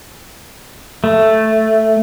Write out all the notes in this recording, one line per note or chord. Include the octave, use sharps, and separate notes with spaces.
A3